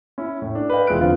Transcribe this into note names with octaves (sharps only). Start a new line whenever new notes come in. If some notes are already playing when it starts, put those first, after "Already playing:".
C#4 E4
A2
D4
B4 D5 D#5 F5 G5
E1 G#3 E4 F4 F#6 D7
F2 D3 B3 C4 F4 F5